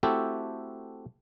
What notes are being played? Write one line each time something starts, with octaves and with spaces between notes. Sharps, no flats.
A3 C4 E4 F#4 G4 A4